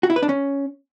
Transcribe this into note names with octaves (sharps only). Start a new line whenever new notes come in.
F#4
E4
B4
D4
C#4